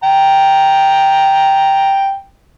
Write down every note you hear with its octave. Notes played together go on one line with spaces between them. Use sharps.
G5 A#5